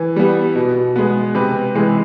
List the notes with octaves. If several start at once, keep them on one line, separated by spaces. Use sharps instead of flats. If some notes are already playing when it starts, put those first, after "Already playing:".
Already playing: E3
G3 B3
B2
G#3 B3
C3 B4
E3 G#3